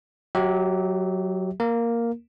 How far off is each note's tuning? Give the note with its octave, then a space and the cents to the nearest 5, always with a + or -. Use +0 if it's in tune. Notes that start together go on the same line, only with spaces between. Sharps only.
F#3 +0 G4 -20 E5 -35
A#3 +0 A#4 +0